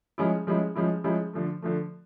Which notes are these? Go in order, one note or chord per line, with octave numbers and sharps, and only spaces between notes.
F3 G#3 C#4 E4
F3 G#3 C#4 E4
F3 G#3 C#4 E4
F3 G#3 C#4 E4
D3 F3 A3
D3 F3 A3